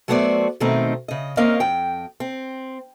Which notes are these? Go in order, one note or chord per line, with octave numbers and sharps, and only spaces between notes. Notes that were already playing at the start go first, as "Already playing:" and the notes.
F#3 A3 B3 F#4 C5 D5
B2 D#3 A3 C4 D#4
C#3 D#5
A#3 C4 C#4 A#4 D#5 F5
F2 G5
C4